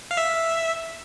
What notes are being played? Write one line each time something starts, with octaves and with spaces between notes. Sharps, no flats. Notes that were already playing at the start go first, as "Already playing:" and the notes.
F5
E5